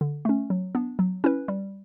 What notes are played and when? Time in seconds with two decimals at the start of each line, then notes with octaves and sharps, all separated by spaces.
0.01 D3
0.25 A3 C#4
0.50 F#3
0.75 B3 D4
0.99 F#3
1.24 C#4 E4 B4
1.48 G3